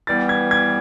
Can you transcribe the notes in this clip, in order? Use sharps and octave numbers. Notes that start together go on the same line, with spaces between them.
E3 G3 B3 A6
G#6
G#6